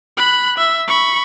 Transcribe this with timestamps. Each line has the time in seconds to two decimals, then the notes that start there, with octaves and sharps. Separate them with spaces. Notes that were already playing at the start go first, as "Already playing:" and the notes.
0.17 B5 F#6
0.58 E5
0.88 B5 C#6